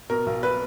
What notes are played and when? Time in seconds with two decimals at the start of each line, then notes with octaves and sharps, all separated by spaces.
0.10 B2 A#4
0.26 B1
0.43 B4